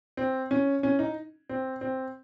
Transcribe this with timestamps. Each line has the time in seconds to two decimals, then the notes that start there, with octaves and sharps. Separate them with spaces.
0.17 C4
0.51 C#4
0.83 C#4
0.99 D#4
1.49 C4
1.81 C4